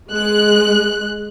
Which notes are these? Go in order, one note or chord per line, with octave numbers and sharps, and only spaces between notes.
G#3 F#6